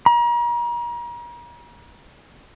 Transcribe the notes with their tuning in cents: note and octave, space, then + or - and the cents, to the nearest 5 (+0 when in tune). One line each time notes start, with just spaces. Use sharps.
A#5 +40